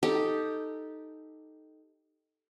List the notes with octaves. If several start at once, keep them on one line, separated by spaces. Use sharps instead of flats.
D#4 G4 A4